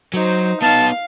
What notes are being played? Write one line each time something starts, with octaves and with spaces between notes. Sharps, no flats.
F#3 D#4 C5
B3 D#4 F5 A5